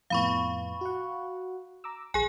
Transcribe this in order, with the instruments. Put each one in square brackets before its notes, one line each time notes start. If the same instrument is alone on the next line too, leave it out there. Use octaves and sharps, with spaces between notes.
[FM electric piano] F2 A2 B3 [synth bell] F5 B5 C#6
[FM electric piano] F#4 F#5
A#5 D6 E6
[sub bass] A#1 [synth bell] G#4 G#5 [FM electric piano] F#6